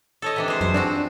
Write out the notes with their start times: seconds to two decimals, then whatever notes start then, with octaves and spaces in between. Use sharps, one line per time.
0.22 A4 C#5 D#5
0.36 C3 E3 D4
0.48 G#3 C5
0.61 F#2 C5
0.74 F3 C4 D4 F#4